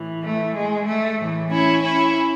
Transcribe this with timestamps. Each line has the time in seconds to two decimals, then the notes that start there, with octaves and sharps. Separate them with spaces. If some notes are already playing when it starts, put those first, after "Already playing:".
Already playing: A2 E3
0.23 A3
0.55 G#3
0.87 A3
1.18 A2 E3
1.51 C#4 E4
1.82 C#4 E4